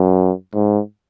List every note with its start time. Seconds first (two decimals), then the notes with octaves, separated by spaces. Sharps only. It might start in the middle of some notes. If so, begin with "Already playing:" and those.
Already playing: F#2
0.54 G#2